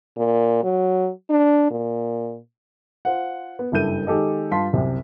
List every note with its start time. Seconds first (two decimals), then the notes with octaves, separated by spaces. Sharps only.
0.17 A#2
0.63 F#3
1.30 D4
1.71 A#2
3.05 F4 C5 F#5
3.59 B3
3.72 F#1 G2 E4 A4 G6 D#7
4.07 D#3 G#3 G4 A4 D#5
4.51 G2 F4 A5 C6 B6
4.73 C2 F#2 C3